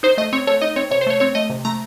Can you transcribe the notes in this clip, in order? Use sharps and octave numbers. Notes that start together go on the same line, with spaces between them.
D#4 C5
A3 D#5
C4 C#5
A3 C#5
D#4 D#5
C4 C#5
C3 C#5
C5
A3 C#5
C4 C#5
A3 D#5
C3
A3 A#5